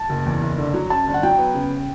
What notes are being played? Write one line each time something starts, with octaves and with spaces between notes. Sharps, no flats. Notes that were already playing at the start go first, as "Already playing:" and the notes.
Already playing: A5
F#1
E2
F#1
D3
F#3
F#2 A5
G1
F#5
F#3 G5
B3
C#3